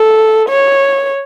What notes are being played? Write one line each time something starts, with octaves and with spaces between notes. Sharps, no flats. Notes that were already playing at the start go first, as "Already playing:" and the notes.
Already playing: A4
C#5